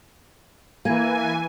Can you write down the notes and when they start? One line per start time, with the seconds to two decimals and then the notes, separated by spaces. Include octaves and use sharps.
0.85 E3 A#3 G#5